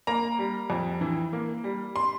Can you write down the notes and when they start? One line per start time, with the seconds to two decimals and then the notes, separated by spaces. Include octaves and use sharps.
0.07 A#3 A#5
0.39 G3
0.70 F2
1.01 E3
1.33 A#3
1.64 G3
1.96 C6